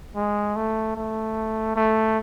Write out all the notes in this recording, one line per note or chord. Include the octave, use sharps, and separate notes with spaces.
G#3
A3
A3
A3